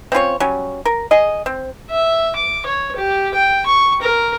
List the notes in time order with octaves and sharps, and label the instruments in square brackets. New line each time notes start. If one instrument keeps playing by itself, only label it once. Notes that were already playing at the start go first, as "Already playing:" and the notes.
[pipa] C4 C#4 F4 C#5
F#3 G3 C#4
A#4
G#4 D#5
C4
[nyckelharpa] E5
D6
C#5
G4
G5
C#6
A#4